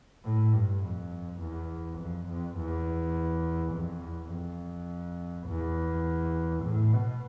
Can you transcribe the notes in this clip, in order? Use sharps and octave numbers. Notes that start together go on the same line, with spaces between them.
A2
G2
F2
E2
F2
F2
E2
F2
E2
F2
E2
A2
B2